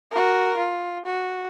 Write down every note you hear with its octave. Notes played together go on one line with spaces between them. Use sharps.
F#4 A#4
F4
F#4